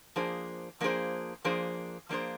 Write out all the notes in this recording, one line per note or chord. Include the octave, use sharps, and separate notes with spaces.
F3 A#3 D4 G#4 C5
F3 A#3 D4 G#4 C5
F3 A#3 D4 G#4 C5
F3 A#3 D4 G#4 C5